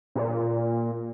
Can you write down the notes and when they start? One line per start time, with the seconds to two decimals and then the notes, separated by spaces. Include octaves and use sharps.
0.15 A#2